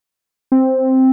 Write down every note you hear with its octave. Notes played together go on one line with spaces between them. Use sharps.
C4